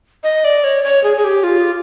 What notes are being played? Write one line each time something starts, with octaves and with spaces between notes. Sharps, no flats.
D#5
D5
C#5
C#5
G#4
G#4
G4
F4